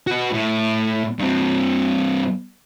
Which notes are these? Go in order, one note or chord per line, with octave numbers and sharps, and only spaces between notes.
F#4 B4
A2
G2 C4